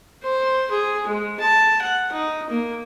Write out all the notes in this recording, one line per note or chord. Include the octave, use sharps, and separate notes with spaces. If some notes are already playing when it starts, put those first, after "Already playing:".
C5
G#4
G#3
A5
F#5
D#4
A#3